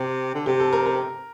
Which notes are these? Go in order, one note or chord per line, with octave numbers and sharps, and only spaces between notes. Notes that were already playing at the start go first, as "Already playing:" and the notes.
Already playing: C3
D3
C3 G4
A4
A#4
A#4